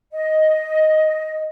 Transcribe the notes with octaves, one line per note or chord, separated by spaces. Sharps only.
D#5